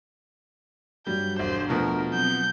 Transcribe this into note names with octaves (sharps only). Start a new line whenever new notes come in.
G2 F#3 G3 G6
E1 D4 C5
B2 F3 A3 A#4
F#3 C4 F#5 G6